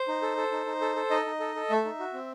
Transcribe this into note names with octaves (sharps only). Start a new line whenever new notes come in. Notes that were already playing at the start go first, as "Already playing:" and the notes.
Already playing: C5
D#4
A4
A4
D#4
D#4
A4
A4
D#4 D#5
D#4
A4
A4
A3 E5
D#4
F#4
C4